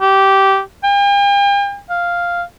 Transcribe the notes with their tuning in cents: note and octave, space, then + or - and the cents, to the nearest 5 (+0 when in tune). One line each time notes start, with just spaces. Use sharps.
G4 -15
G5 +45
F5 -5